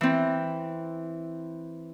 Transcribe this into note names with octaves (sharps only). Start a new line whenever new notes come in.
E3 C4